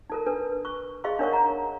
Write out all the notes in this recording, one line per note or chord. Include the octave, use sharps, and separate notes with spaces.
D#4 A4 A#4
D4 A4 B4
C#6
G#4 D#5 F5 C6 C#6
D4 D#4 A#4 C#5 F#5 C#6
F#5 A#5